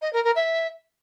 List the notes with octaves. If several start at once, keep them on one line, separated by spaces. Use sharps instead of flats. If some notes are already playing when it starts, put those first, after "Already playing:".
D#5
A#4
A#4
E5